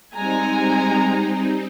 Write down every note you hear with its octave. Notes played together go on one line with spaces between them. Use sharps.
G3 G#3 C4 D#4 G#5 A#5